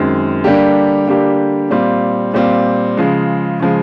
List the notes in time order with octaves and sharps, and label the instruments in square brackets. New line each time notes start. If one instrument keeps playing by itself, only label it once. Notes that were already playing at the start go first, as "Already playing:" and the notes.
Already playing: [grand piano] F#2 D#3 G#3 C4
D3 G3 A#3 D4 G4
D3 G3 A#3 D4 G4
A#2 G3 C4 F4
A#2 G3 C4 F4
C#3 F3 G#3
C#3 F3 G#3